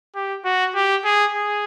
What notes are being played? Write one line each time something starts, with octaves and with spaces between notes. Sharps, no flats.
G4
F#4
G4
G#4
G#4